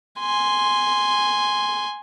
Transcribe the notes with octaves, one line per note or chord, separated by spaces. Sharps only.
G#5 C6